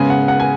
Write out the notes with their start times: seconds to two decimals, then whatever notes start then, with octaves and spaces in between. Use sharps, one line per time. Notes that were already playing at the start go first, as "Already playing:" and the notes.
Already playing: C#3 G#3 B3 G#5
0.10 F#5
0.28 F#5
0.40 G#5